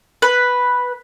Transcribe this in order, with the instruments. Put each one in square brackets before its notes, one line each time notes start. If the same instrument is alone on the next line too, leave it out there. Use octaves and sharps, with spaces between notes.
[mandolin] B4